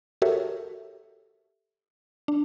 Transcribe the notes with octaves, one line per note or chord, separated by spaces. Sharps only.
F#4 G4 A4 A#4 C#5 E5
D4